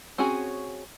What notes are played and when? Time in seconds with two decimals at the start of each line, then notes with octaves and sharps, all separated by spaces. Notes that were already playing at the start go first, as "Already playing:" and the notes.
0.18 C4 C#4 F#4 G#4